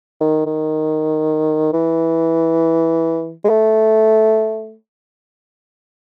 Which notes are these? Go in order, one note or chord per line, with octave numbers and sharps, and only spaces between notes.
D#3
D#3
E3
G#3
A3